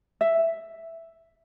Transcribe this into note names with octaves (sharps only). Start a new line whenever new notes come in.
E5